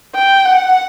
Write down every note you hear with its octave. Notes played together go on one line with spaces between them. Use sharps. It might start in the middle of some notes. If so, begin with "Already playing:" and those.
G5
F#5